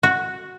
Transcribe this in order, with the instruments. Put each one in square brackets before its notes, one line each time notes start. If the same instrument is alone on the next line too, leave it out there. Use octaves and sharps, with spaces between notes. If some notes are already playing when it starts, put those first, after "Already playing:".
[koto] F#4